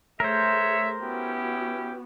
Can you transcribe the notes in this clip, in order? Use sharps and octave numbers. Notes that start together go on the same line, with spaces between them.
A3 G#4 A#4 C5 C#5 E5
B3 C#4 E4 F#4 G4